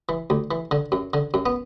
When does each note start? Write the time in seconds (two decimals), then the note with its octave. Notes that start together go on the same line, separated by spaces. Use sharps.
0.09 E3
0.30 D2
0.51 E3
0.71 D3
0.92 F#2
1.14 D3
1.34 F#2
1.46 B3